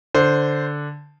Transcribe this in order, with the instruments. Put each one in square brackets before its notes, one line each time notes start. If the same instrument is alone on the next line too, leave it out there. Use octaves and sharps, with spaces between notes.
[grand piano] D3 C5